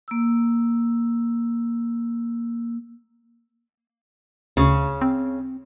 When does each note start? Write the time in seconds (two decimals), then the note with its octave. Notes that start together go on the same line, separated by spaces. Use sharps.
0.08 A#3 E6
4.57 D2 C#3
5.01 C4